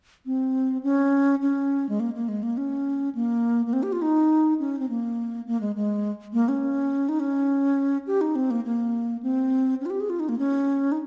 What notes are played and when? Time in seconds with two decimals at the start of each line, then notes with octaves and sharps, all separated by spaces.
0.26 C4
0.83 C#4
1.42 C#4
1.89 G#3
2.00 A#3
2.15 A#3
2.29 G#3
2.43 A#3
2.57 C#4
3.15 A#3
3.66 A#3
3.73 C4
3.83 G4
3.92 F4
4.02 D#4
4.60 C#4
4.79 C4
4.89 A#3
5.47 A#3
5.61 G#3
5.76 G#3
6.33 A#3
6.48 C#4
7.09 D#4
7.20 C#4
8.07 G4
8.21 D#4
8.36 C4
8.51 A#3
8.65 A#3
9.23 C4
9.81 C#4
9.86 F4
9.90 G4
10.00 G#4
10.10 F4
10.20 D#4
10.29 A#3
10.39 C#4
10.92 D#4